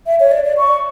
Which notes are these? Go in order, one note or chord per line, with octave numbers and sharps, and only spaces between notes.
E5
C#5
D5
D5
C#6